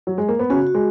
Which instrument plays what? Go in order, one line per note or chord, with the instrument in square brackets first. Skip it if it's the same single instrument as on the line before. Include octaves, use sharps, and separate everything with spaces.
[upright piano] F#3
G#3
A#3
B3
[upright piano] C#3 C#4 [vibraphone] F#4
[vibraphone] F#4
[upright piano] G#3